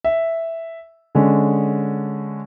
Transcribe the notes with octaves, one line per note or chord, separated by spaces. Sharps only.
E5
D3 G#3 C#4